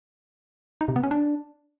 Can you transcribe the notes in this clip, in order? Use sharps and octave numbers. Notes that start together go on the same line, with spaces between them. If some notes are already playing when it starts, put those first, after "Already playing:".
D#4
C3
B3
C#4
D4